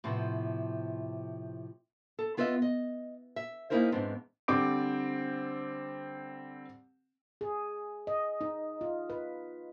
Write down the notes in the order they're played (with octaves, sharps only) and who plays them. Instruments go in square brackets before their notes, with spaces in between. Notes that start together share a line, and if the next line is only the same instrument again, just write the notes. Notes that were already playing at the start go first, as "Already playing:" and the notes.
[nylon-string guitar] A2 C3 F3 B3
A4
B3 F4 B4 D#5 E5
D#5
E5
A#3 C#4 D#4 E4 A#4 C5
E2 G#2 B3 C4 D4
[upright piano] D3 G3 C4 D6 D7
[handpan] G#4
D#5
D#4
F4
B4